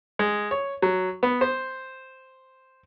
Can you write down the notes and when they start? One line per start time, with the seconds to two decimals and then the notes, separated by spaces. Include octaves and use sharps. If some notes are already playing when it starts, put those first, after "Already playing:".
0.19 G#3
0.51 C#5
0.82 F#3
1.23 B3
1.41 C5